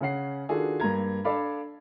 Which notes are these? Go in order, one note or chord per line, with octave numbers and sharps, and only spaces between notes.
C#3 C#4 F#5 C7
D#3 D4 F4 F#4 G#4 A4
G2 A#3 A#5 G#6
D4 A4 D5 F5 B5